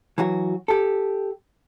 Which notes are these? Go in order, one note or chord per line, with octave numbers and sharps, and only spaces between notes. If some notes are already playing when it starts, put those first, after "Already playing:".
E3 F#3 F#4
G4 A4